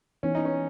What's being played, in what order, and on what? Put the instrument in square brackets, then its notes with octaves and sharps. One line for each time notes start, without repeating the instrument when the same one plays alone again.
[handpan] E3 B3 D#4 [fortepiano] C#4
[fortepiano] D#4
C#4